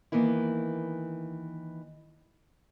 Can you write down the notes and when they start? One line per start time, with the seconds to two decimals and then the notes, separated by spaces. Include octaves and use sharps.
0.12 D#3 E3 A#3 B3 E4